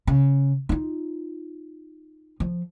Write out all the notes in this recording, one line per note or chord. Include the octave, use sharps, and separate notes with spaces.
C#3
D#4 F4
F3